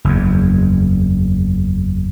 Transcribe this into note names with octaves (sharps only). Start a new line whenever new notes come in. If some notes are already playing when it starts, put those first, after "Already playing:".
F#1 E2